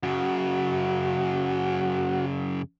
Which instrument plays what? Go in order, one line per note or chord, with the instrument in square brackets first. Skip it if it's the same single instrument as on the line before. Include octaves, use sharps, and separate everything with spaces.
[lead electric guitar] F#2 C#3 [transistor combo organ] F#4